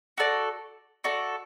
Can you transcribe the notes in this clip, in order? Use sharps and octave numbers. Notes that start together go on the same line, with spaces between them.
F#4 A4 D5
F#4 A4 D5